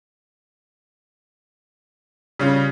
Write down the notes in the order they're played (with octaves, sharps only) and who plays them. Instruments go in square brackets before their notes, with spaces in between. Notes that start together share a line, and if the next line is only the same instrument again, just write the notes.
[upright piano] C#3 [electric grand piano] G3 C#4 F4